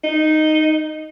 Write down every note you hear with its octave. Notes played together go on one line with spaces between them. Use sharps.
D#4